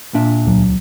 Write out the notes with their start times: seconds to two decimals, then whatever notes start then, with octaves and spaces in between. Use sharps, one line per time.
0.14 A#2 D4 E5
0.45 D#1 C#2 F#3